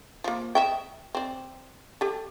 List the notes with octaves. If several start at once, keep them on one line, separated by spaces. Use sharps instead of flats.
F3 A#3
D#5 E5 G5
C4 D5
G4 A4